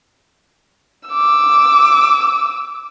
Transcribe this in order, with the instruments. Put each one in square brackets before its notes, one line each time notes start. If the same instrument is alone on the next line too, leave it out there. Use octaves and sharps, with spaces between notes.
[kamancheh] D6 E6